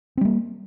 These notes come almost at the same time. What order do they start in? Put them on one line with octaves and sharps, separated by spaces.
C4 G3 A#3